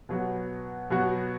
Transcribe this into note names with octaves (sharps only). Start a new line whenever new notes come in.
B2 F#3 B3 F#4
B2 F#3 B3 F#4